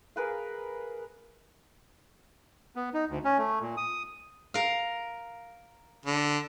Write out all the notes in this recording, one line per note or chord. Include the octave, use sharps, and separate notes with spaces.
G#4 A#4 B4 F5
B3
D#4
D2
C#4
A3
A#2
D#6
A#4 F5
D3